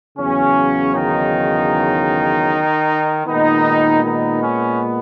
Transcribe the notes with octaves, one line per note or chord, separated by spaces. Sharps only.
E2 C#3 F#3 C#4
D#3 D#4
A#2 D#3 G#3 B3 D#4
D#3 D#4
C#4